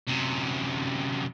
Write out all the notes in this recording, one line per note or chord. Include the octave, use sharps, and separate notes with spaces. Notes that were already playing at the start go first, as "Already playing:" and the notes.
F#2 C3